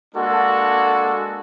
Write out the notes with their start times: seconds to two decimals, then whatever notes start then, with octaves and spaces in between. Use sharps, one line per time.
0.15 G#3 A#3 D4 F#4 A4